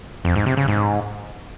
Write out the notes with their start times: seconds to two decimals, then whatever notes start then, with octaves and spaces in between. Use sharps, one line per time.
0.25 F2
0.36 G#2
0.46 C3
0.57 C#3
0.68 G#2